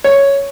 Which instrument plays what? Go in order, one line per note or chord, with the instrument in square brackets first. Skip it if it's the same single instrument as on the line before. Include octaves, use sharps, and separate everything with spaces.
[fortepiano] C#5